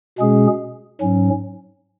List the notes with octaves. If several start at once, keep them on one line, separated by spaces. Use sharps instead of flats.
B2 G#3 C#4 G#4
G#2 F#3 C#4